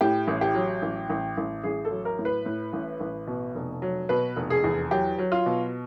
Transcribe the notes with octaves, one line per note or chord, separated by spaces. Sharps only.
A2 G4
A1
G4
F#3
A1
A1
A1
A1 G#4
A4
F#3
A#4
A2
B4
A2
A1
A1
B2
F1
F#3
B2 B4
F1
G#4
E2
F#3 G4
F#3
F4
B2